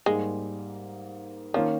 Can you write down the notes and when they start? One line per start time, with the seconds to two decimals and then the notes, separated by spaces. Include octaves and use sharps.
0.06 G#2 G3 G#3 A#3
1.54 D#3 F3 A#3 C#4